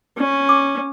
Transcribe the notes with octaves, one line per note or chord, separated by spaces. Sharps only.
C#4
D6